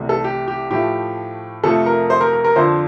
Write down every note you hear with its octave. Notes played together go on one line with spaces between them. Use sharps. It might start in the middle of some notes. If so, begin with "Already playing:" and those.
Already playing: C2 C3 E3 A3
A4
G4
G4
A2 F3 A3 G4
F2 C3 F3 A3 A4
A#4
C5
A#4
A#4
A#4
F2 D3 F3 C5